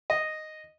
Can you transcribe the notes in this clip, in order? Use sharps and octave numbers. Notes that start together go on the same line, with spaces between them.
D#5